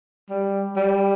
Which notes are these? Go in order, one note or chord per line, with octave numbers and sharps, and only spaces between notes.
G3
G3